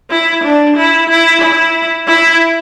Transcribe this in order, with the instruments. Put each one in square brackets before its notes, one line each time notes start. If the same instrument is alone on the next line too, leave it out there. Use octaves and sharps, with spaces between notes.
[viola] E4
D4
E4
E4
E4
E4